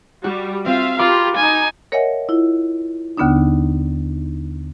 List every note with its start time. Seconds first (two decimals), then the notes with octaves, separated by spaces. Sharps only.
0.24 G3 F#4
0.66 C4 F4 E5 F5
0.99 F4 G4 A#4 B5 C6 D6
1.37 D#4 G#5
1.92 A#4 C#5 D#5 E5 F#5 G#5
2.29 E4 F4
3.17 D#2 D3 B3 D4 D#4